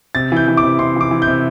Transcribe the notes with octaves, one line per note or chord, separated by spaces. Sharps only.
C3 A6
E3 G6
E3
D6
C3
C3 C6
E3 D6
E3
G6
C3